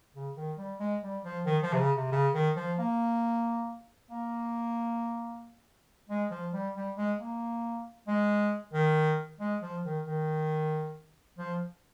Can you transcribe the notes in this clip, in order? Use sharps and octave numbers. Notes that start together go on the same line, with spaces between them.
C#3
D#3
G3
G#3
G3
F3
D#3
F3
C3
C#3
C3
C#3
D#3
F3
A#3
A#3
G#3
F3
G3
G3
G#3
A#3
G#3
D#3
G#3
F3
D#3
D#3
F3